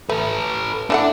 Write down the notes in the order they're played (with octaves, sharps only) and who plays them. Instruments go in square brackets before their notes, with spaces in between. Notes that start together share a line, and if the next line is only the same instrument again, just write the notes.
[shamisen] A3 [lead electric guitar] A4 B4
[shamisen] E3 A3 F#5 [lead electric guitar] D4